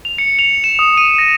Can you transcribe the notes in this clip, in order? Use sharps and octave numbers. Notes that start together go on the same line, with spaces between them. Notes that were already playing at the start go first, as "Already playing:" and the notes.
F7
C#7
F7
E7
D#6
D#7
A#6